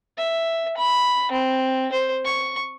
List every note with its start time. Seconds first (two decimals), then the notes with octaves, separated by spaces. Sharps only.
0.18 E5
0.78 B5
1.32 C4
1.92 C5
2.25 C#6